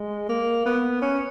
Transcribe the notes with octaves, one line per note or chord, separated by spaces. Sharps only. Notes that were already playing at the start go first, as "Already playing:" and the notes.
Already playing: G#3
A#3
B3
C#4